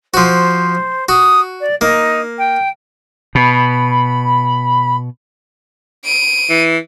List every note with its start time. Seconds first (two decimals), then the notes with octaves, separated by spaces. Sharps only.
0.14 F3 F#4 C5
1.09 F#4 D#6
1.61 D5
1.81 A#3 D#4
2.38 G5
3.35 B2 B5
6.05 D7 D#7
6.50 E3